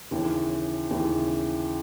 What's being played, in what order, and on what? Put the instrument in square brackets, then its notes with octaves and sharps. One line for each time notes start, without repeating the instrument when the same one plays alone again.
[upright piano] D#2 C#3 E3
D#2 C#3 E3